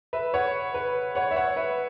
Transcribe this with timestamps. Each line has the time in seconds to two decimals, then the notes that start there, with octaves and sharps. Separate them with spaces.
0.13 B4 E5
0.34 C#5 F#5
0.74 B4
1.15 C#5 F#5
1.31 E5
1.36 C#5 F#5
1.56 B4 E5